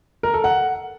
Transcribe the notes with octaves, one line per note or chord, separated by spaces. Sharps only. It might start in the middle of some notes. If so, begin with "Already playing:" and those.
A#4
A4
F#5